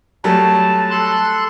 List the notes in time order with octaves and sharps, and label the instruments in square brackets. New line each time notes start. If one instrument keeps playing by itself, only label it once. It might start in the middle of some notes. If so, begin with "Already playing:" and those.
[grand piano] F#3 G3 A3 [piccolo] A5
[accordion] A4 C6 F#6